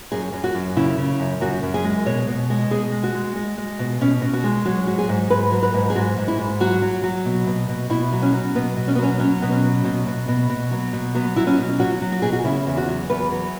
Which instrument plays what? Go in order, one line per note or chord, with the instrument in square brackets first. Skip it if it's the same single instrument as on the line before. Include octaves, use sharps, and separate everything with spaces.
[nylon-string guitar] F#2 G#4
F#2
F#4
F#2
C#3 E4
C#3
F#2
F#2 F#4
F#2
G#4
G#3
B2 C#5
B2
G#3
B2 G#4
G#3
F#4
G#3
G#3
G#3
B2
B2 C#4
B2
F#4
G#3
F#3 F#4
G#2 F#4
G#4
G#2
G#2 B4
F#3
B4
G#2
G#4
G#2 F#4
G#2
E4
G#2
F#3 F#4
F#3
F#3
B2
B2
B2
B2 E4
F#3
C#4
F#3
B2 B3
B2
C#4
B3
F#3 C#4
F#3 C#4
B2 B3
C#4
F#3
B2
B2
B2
B2
F#3
B2
F#3 B3
F#3 E4
C#4
B2
F#3 F#4
F#3
F#4
B2 G#4
F#4
C#3 E4
E2
F#4
F#3
E2 B4
F#3